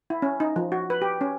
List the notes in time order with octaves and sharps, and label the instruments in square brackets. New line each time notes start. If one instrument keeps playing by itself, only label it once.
[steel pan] E4
C#4
D#4
F3
F#4
B4
G4
C#4